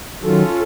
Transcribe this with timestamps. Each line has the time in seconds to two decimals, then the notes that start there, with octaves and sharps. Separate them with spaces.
0.22 D#3 F#3 C#4 F4 A4